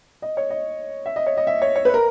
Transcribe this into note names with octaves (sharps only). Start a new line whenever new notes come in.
D#5
C#5
D#5
E5
D#5
C#5
D#5
E5
C#5
C#5
B4
A#4